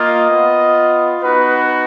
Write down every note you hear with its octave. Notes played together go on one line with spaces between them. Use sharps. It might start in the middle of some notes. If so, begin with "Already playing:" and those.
Already playing: A#3 F4 D#5
B3 F4
B3 D#4 F#4 B4